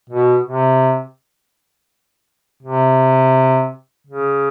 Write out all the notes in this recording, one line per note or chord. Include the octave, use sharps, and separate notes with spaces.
B2
C3
C3
C#3